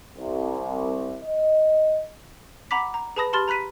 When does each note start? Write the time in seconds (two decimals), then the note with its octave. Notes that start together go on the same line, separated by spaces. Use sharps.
0.16 C2
1.23 D#5
2.71 F#5 A#5 B5 D6 B6
2.94 A#5
3.16 G#4 B4 A5 B5 D#6 A#6
3.33 G4 A5 B5 C6 F6 A6
3.48 A#5 B5 F#6 B6 D#7